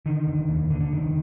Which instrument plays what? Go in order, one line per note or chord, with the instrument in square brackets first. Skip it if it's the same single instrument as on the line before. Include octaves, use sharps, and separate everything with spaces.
[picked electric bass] D3 D#3
F1
D#2
D3
D3
F1 D#3